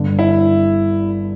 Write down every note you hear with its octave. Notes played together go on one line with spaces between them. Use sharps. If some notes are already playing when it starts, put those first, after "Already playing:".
Already playing: G1 G2 D3
E4